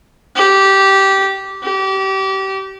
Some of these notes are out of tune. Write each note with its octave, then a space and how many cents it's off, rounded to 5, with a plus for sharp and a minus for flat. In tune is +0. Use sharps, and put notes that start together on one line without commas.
G4 -15
G4 -30